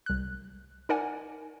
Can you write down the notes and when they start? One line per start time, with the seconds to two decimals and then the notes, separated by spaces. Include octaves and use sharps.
0.06 C2 F#6
0.89 D#4 A#4 D5 F#5 G#5